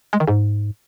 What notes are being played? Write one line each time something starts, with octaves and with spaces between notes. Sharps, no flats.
G#3
D#3
G#2